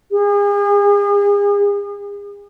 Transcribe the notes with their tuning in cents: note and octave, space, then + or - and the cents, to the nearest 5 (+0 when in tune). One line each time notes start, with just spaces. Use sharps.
G#4 -40